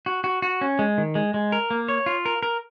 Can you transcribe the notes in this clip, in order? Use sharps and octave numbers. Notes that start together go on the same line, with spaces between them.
F#4
F#4
F#4
C#4
G#3
D#3
G#3
G#3
A#4
A#3
C#5
F4
A#4
A#4